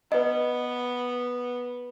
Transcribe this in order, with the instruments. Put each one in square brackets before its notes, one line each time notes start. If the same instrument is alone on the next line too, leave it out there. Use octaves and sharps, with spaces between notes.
[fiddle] B3 [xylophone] B4 D#5